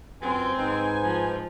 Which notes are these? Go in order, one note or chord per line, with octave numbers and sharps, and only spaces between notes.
F#2 C4 F4 B4 G#5
G#2 D#4 B4 C5
F3